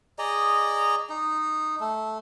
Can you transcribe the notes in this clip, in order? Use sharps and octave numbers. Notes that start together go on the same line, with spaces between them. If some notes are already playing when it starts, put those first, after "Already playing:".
G#4 D5 D#5 A#5
D#4
A3